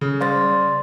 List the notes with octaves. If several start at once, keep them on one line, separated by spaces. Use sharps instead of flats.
C#3
G3 C5 D5 C6 A6